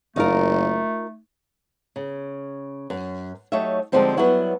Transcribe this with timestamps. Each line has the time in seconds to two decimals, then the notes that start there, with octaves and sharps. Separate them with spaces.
0.16 F#1 A3 D#4 F4 A#4
1.96 C#3
2.90 F#2
3.52 F#3 A3 D#4 G4 C#5 E5
3.92 D3 F3 G3 G#3 C4 D#4
4.17 F#3 G3 B3 E4 F#4